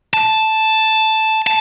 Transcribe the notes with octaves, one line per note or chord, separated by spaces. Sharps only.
A5
A5